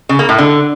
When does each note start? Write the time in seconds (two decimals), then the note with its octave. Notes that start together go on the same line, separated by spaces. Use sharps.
0.09 C#3
0.19 A#3
0.29 A2
0.38 D3